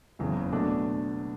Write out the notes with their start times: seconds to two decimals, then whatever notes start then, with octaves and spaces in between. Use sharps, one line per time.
0.19 F#1 E2 C#3
0.52 B2 A3 D4